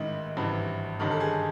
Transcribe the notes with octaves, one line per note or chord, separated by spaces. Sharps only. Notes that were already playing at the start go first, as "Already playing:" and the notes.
Already playing: A1 G#2 D#3 E4
G#1 G2 E3
G1 G2 D#3
A4
G#4